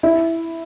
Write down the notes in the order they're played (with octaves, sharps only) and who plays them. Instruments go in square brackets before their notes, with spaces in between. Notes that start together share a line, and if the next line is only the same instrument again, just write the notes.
[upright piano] E4